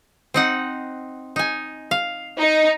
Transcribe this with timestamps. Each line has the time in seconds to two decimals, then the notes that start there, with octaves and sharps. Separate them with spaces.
0.34 C4 D#4 F#5
1.36 D#4 G#5
1.91 F5
2.40 D#4